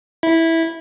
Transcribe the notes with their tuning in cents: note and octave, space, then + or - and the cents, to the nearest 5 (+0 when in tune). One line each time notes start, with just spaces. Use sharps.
E4 -10